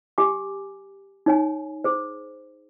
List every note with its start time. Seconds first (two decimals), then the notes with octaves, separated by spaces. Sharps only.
0.18 G4 G#5 D6
1.26 D#4 C#5 G#5
1.84 G#4 C5